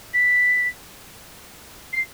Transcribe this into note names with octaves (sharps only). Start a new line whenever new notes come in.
B6
C7